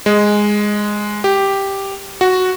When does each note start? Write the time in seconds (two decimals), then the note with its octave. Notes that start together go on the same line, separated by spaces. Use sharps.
0.06 G#3
1.24 G4
2.21 F#4